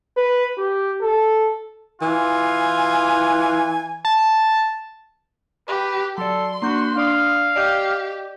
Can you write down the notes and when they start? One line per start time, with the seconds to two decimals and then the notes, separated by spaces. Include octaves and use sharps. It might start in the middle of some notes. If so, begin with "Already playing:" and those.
0.17 B4
0.58 G4
1.02 A4
2.02 E3 F4 G#5
4.05 A5
5.68 G4 B4
6.18 F#3 A4 D5 C6
6.62 A#3 D4 F#4 G6
6.96 D4 D5 F5 D#6
7.56 G4 D5 D#5 G6